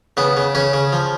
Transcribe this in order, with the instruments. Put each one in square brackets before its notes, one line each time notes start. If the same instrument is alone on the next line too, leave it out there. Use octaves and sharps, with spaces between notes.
[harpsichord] C#3 B3
C#3
C#3 C#4
C#3
F3